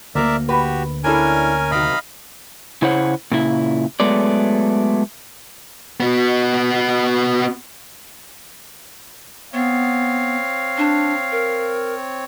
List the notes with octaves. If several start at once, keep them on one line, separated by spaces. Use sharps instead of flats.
D2 A#3 A#4 D5 E5
F#4 G4 B4
C#4 D4 E4 A4 A#4 G#5
C3 D#3 F#3 D#5 F5 B5
C#3 E4 C5 C#5 F#5
A#2 C#3 E4
F#3 G#3 A3 B3 D5
B3 F#4
B3 C4 C#5 F5
D4
A#4